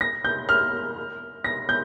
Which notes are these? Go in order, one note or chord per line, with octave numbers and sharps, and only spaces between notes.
A#6
G6
F6
A#6
G6